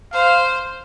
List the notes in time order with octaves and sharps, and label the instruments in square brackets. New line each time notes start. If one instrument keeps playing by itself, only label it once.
[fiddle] C5 [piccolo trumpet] F5